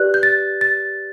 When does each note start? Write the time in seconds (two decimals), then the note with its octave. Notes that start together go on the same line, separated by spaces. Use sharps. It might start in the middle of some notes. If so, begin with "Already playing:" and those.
Already playing: G4 B4 D5 F#6
0.14 G6
0.23 A6
0.61 A6